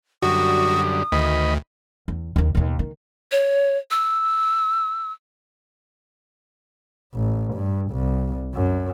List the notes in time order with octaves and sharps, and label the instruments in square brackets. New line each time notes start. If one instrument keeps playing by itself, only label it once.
[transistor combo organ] F#2 D3 G3 [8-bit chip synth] F#4 [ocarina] D#6
[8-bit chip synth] D2 [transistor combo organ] D#3 D#5 B5
[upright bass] E2
D#2 D#3
D#2 B2
D#3
[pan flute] C#5
E6
[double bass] A1
G2
C2
F#2